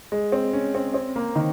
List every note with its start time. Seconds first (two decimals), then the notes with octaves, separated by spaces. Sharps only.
0.12 G#3
0.32 C4
0.53 C#4
0.75 C4
0.94 C4
1.16 A#3
1.35 D#3